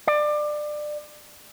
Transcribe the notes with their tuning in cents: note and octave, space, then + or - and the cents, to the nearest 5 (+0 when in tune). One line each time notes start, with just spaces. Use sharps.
D5 +25